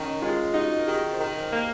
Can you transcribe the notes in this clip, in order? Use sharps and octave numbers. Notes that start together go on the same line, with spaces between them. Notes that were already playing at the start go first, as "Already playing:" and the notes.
Already playing: D#3 C#4
G#3 F4
D#4 F#4
A#4
D#3 G#4
C5
D#3 A#4
C5
A#3 A#4